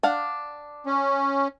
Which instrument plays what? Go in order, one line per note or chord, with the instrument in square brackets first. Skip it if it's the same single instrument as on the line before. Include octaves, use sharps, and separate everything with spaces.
[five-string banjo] D4 F5 F#5
[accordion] C#4